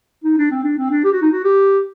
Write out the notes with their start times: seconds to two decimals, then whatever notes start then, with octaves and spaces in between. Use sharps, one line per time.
0.24 D#4
0.38 D4
0.51 C4
0.64 D4
0.78 C4
0.91 D4
1.04 G4
1.12 F#4
1.22 D#4
1.32 F#4
1.44 G4